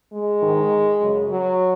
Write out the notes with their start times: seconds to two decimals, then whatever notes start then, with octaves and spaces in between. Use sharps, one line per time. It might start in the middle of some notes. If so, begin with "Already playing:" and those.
0.11 G#3
0.42 G#2 D#3
1.01 F#2 C#3
1.30 F#3